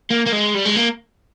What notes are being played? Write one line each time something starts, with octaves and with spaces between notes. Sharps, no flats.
A#3
A#3
G#3
G3
G#3
A#3